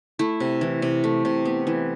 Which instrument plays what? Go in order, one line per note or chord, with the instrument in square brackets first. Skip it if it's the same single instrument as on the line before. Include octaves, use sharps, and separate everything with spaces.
[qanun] A3 E4
C3
E3
C3
A3
C3
B3
E3